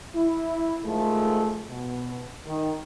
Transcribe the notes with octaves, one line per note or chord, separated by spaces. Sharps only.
E4
D#3 F3 G#3 A3
B2
D#3